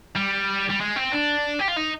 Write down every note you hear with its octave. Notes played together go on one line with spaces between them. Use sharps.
G3
G3
G#3
C4
D4
G4
F4
D#4